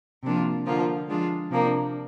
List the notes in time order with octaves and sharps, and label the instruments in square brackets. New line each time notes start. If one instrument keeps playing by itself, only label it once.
[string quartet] C3 F3 A#3 D4 F4
D3 F3 A#3 F4
F3 G#3 D4 F4
C3 F3 A#3 D4